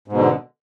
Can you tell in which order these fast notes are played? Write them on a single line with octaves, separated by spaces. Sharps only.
G#2 B2 D3